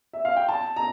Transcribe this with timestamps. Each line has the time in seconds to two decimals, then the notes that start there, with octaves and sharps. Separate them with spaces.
0.13 E5
0.25 F5
0.36 G5
0.49 A5
0.76 A#5